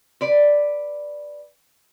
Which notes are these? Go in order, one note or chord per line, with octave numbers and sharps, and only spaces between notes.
B4 D5